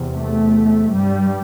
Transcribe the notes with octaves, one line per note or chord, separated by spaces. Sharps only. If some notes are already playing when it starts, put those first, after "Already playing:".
Already playing: E2 C3
A3
G2 G3